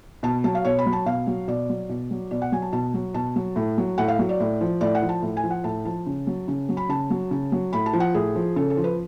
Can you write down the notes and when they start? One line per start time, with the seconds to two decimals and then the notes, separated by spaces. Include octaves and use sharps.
0.23 B2 A5
0.44 F#3 A5
0.55 F5
0.65 B2 C#5
0.79 B5
0.86 F#3
0.93 A5
1.06 B2 F5
1.27 F#3
1.48 B2 D5
1.69 F#3
1.89 B2
2.11 F#3
2.31 B2 D5
2.42 F#5
2.52 F#3 G#5
2.62 A5
2.73 B2 A5
2.94 F#3
3.14 B2 A5
3.36 F#3
3.56 A2
3.78 F#3
3.98 A2 F#5
4.08 F5
4.19 F#3
4.29 D5
4.40 A2
4.61 F3
4.81 A2 D5
4.95 F#5
5.02 F3
5.09 A5
5.22 A2
5.37 G#5
5.44 F3
5.51 F#5
5.64 A2 A5
5.85 F3 A5
6.06 C#3
6.27 F#3
6.48 C#3
6.69 F#3
6.77 B5
6.89 C#3 A5
7.10 F#3
7.31 C#3
7.52 F#3
7.73 A2 B5
7.86 A5
7.93 F3
8.00 F#5
8.14 A2 G#4
8.35 F3
8.56 C#3 A4
8.70 A4
8.77 F3
8.84 B4